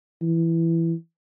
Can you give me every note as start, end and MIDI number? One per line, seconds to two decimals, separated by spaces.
0.22 0.93 52